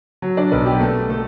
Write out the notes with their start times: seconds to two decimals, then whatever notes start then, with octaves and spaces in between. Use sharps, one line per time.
0.22 F#3
0.37 D4 D5
0.51 B1 B3 B4
0.66 G4
0.80 A3 A4
1.09 A3 A4